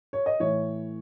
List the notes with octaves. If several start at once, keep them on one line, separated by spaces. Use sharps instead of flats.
C#5
D#5
A2 E3 C#5